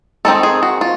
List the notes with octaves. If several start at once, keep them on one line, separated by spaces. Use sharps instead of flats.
D#3 G#3 C4 D#4 A4
G#4
F#4
F4